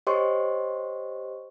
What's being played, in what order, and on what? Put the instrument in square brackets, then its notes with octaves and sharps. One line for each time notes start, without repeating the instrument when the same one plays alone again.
[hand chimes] G4 C5 C#5 D#5 C6 C#6